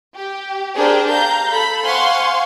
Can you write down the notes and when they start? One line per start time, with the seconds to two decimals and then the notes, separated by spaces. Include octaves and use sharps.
0.14 G4
0.76 D4 G4 G#4 A#4 C5
1.10 F5 A#5 G6
1.52 A4 B5
1.85 C5 F5 F#5 G#5 C6 C#6